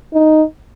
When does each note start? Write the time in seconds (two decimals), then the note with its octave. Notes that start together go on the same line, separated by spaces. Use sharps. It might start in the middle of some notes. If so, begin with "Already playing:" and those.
0.13 D#4